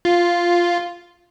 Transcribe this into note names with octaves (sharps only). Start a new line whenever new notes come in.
F4